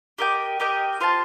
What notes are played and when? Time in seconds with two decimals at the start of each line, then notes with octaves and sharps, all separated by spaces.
0.18 G4 A#4 D#5 G5
0.60 G4 A#4 D#5 G5
1.00 F4 C5 F5 A5